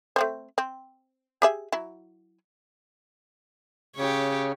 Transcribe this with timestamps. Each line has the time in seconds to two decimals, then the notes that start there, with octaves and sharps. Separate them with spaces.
0.16 A3 C4 C5
0.58 C4
1.42 G4 G#4 E5
1.72 F#3 E4
3.96 C#3 G4 C#5